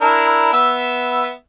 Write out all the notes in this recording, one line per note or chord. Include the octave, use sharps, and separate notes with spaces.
D4 E4 A#4
B3 E5 E6